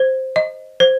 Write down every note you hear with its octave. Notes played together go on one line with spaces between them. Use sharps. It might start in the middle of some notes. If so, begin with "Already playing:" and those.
Already playing: C5
D#5
C5